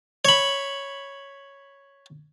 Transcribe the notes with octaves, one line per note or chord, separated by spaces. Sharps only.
C#5 B5